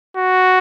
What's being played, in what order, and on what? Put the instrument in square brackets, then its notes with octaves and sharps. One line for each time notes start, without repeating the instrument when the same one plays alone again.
[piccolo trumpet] F#4